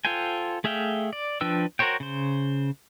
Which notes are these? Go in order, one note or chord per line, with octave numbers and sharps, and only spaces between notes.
F4 A4 C5 G5 G#5
A3 G#4 E5 F5 G5
D5
F3 D4 B4 G5 E6
F#4 A#4 C5 C#5 G5
C#3 C5